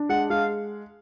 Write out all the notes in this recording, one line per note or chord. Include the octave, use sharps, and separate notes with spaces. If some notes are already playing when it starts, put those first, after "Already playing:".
Already playing: D4
G#3 F#5
G#3 F5